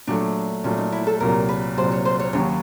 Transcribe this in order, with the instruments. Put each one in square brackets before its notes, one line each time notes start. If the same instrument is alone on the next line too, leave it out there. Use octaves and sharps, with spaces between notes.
[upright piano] A#2 F#3 A3 [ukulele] D4
[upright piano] A#2 F#3 A3 [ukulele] C#4
[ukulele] D#4
E4
A4
[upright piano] C2 A#2 F#3 [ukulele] A#4
[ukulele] B4
[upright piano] C2 A#2 F#3 [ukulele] C5
[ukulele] C#5
C5
C#5
[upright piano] D#2 C#3 F#3 [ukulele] C#5